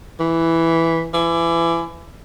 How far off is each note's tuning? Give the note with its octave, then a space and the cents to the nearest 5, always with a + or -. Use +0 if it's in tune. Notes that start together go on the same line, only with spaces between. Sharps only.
E3 +0
E3 +30